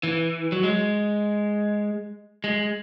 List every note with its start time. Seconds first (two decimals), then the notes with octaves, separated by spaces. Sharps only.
0.03 E3
0.52 F#3
0.63 G#3
2.44 G#3